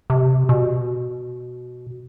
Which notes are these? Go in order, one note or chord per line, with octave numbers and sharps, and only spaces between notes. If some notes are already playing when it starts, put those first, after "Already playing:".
C3
B2